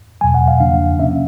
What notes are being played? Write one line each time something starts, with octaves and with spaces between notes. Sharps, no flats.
E2 B2 F#3 G#5
F#5
F5
E2 C#3 F3 A#3 D4 F5
C3 F3 A#3 C#4 E5